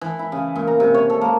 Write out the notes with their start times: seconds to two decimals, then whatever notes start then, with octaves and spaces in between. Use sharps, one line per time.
0.01 E3
0.19 E4
0.32 C#3
0.56 A#2
0.67 A#5
0.80 C3
0.94 C#5
1.10 A4
1.21 A#3